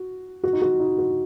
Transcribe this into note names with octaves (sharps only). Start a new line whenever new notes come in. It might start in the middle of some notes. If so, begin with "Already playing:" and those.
Already playing: F#4
F#4
D#4
F#4
D#4
F#4